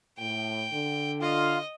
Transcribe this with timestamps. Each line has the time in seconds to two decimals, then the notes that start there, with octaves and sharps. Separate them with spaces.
0.18 A2 G5
0.72 D3
1.21 F4 D#5 F5